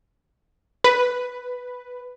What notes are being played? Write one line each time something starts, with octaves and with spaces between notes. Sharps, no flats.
B4